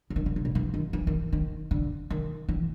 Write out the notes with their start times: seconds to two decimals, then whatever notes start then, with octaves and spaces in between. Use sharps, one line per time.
0.10 D3
0.16 D#3
0.26 D3
0.36 C#3
0.45 B2
0.55 E3
0.74 D#3
0.93 E3
1.07 D#3
1.33 D#3
1.71 D3
2.10 D#3
2.49 E3